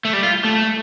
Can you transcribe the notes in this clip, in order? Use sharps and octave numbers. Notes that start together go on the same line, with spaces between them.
A3
G3
F4
A3